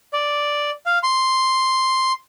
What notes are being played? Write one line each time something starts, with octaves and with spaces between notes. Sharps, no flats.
D5
F5
C6